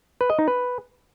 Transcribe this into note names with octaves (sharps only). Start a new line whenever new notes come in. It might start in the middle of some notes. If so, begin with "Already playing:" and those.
B4
D#5
D#4
B4